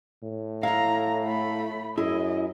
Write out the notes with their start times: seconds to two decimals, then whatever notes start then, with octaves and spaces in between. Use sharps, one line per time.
0.23 A2
0.63 E4 F5 F#5 A#5
1.24 A3 B5
1.98 F#2 E4 G#4 D#5